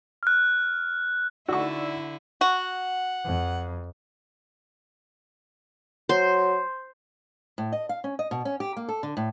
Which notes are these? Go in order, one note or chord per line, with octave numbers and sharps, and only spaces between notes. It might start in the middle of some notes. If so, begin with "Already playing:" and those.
F6 F#6
D3 D#4 E4 F#4 D5 C#6 E6
F#4 F#5
F2
F#3 C5
A2
D#5
F5
C#4
D#5
B2
C#4
G4
A#3
A4
D3
A2